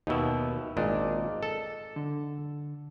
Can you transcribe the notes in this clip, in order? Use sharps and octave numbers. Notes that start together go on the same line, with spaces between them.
D#2 B2 D#4 E5 E6
G#1 A#2 D4 D#5
A4
D3